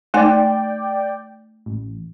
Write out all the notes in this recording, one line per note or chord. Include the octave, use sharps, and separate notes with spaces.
A3 D#4 D5 G5 G#5
A1